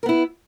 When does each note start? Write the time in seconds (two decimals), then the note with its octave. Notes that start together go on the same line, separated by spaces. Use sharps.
0.03 A#4
0.06 B3
0.09 E4